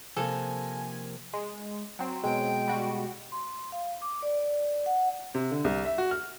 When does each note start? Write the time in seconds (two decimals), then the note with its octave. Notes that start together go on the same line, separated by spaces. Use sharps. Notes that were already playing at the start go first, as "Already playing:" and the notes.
0.17 C3 F3 A#3 A4 G#5
1.33 G#3
1.99 F#3 C4
2.23 B2 G#3 G5
2.68 G3 F#4
3.32 C6
3.72 F5
4.02 D6
4.23 D5
4.39 D5
4.86 F#5
5.35 C3
5.51 D3
5.64 C2
5.85 E5
5.98 F#4
6.11 F6